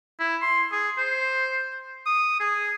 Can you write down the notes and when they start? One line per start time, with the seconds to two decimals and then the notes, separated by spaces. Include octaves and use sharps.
0.20 E4
0.42 C6
0.72 G#4
0.98 C5
2.06 D#6
2.40 G#4